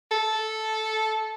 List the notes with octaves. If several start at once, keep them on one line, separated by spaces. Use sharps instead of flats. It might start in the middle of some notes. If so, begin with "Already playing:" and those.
A4